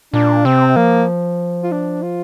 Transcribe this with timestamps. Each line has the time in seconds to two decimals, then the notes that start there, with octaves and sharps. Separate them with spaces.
0.14 A#2 D4
0.45 C3 C4
0.76 F3 A#3
1.63 F4
1.72 D4
2.02 F4